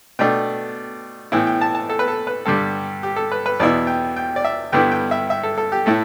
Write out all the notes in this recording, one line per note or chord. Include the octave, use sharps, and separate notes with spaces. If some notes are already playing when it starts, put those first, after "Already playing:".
B2 A3 D4 G5
A2 E3 B3 E4 G5
G5
A5
A5
A4
B4
A4
B4
G2 D3 G3 A4
G4
A4
B4
B4
E2 B2 B3 E4 D5
G5
G5
D5
E5
G2 D3 G3 B3 E4 G5
G5
E5
E5
A4
A4
G4
A2 A3 E4 A4